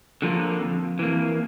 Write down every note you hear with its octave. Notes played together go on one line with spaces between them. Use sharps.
D3 F3 A#3
F2
E3 A#3